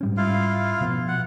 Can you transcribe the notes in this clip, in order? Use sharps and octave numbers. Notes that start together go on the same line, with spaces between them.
G#2 G3 C#4
E4 F4 F5
B2 F3 B3
F#5